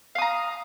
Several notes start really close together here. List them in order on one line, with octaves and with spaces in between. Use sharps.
F5 D#6 A#5